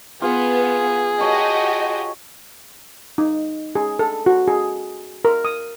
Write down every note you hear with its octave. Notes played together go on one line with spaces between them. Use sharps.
B3 F4 G#4
F#4 G4 C#5 D#5 A5
D#4
G#4
A4
F#4
G#4
A#4
D#6